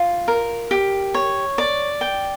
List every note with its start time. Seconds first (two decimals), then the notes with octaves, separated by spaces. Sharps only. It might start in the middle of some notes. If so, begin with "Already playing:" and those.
Already playing: F4
0.28 A#4
0.71 G4
1.14 C#5
1.58 D5
2.01 G5